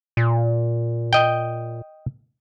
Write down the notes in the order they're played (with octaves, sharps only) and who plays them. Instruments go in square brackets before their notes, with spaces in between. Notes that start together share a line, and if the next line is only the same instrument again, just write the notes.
[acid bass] A#2
[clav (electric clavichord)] D#5 G5